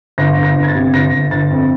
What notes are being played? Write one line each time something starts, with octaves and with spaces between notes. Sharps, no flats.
G1 A#6
G1
A#6
G1
G#6
A6
C3
G1 A#6
G1
G1 A6
F2